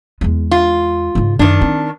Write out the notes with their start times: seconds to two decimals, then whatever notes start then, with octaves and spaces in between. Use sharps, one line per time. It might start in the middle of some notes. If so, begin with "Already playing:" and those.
0.21 E2 G#3
0.51 F4
1.15 G#2 C#3
1.39 F#2 D#3 D4
1.61 C4